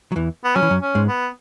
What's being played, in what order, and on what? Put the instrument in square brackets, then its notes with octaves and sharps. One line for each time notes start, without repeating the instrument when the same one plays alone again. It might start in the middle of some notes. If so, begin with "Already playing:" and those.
[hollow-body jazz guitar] F#3
E2 E3
[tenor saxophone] B3
[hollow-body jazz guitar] F#3 [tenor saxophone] C#4
[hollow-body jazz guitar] E3
F#2 F#3
[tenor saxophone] C#4
[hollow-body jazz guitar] G#2 G#3
[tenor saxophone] B3